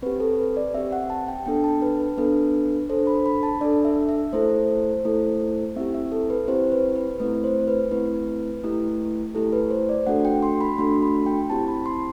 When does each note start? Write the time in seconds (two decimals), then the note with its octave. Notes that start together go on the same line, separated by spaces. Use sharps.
0.02 C4 G4 B4
0.20 A4
0.38 B4
0.57 D5
0.74 C4 G4 E5
0.92 F#5
1.10 A5
1.28 G5
1.46 B3 D4 A4 G5
1.64 A5
1.82 B4
2.00 B4
2.17 B3 D4 A4 B4
2.90 D4 A4 C5
3.07 B5
3.26 B5
3.43 A5
3.61 D4 A4 D5
3.85 E5
4.09 E5
4.33 A3 E4 A4 C5
5.05 A3 E4 A4
5.76 C4 E4 G4 E5
5.95 E5
6.12 A4
6.30 B4
6.48 C4 E4 G4 C5
6.72 B4
6.96 B4
7.20 A3 C4 E4 B4
7.44 C5
7.68 B4
7.91 A3 C4 E4 B4
8.64 A3 E4 G4
9.35 A3 E4 G4 A4
9.53 B4
9.71 C5
9.89 D5
10.07 A3 D4 F#4 A4 F#5
10.25 G5
10.42 C6
10.61 B5
10.78 A3 D4 F#4 A4 C6
11.02 B5
11.26 G5
11.50 C4 E4 G4 A5
11.68 B5
11.86 C6